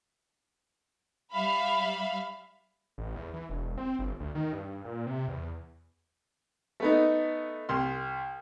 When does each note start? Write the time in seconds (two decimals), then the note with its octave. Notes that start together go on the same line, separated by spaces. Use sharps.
1.31 G3 E5 F5 B5
2.98 A1
3.16 E2
3.34 E3
3.49 E1
3.78 C4
3.99 G1
4.20 D2
4.35 D#3
4.53 G2
4.85 A#2
5.06 C3
5.28 E2
6.80 A3 B3 D#4
7.69 C2 C6